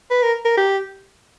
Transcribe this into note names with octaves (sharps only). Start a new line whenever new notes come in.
B4
A#4
A#4
G4